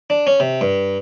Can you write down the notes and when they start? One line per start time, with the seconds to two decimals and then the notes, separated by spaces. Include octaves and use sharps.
0.10 D4
0.27 C#4
0.40 C3
0.61 G2